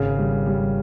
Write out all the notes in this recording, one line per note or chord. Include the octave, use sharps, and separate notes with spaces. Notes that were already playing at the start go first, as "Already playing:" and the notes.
Already playing: G#1 C#3
G3
G3